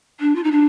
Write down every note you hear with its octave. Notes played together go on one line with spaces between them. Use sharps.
D4
F4
D#4
D4